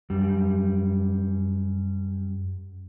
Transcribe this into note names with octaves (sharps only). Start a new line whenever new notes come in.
F#2 G3